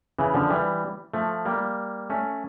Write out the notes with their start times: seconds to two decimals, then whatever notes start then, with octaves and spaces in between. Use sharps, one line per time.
0.19 C#3 E3
0.34 D3 F3
0.50 E3 G3
1.14 F3 A3
1.45 G3 A#3
2.10 A3 C#4